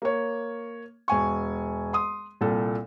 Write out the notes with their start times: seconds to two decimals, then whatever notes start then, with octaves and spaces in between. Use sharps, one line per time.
0.02 A#3 C#5
1.08 E1 G#5 C#6
1.93 C6 D#6
2.41 C2 A#2 A4